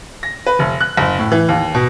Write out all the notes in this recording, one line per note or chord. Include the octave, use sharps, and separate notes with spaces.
A#6
B4
F1
F#6
F#1
A2
E3
D#2
B2